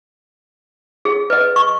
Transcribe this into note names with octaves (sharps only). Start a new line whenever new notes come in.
G#4
B4 D#5
C#6